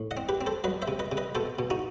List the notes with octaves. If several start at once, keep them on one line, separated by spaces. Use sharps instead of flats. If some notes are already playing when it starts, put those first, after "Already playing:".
Already playing: A2
D#5 F#5
C4
G4 B4
C4
A4 C5
F#3 B4 D#5
C5 E5
C3
B4 D#5
C3
B4 D#5
B2 A4 C5
B2
D#4 F#4